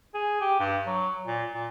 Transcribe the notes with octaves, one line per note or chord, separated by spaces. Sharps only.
G#4
G4
G2
F#3
A#2
A#2